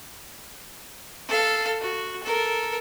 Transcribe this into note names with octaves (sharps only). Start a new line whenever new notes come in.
A4 F5
F#4
A4 A#4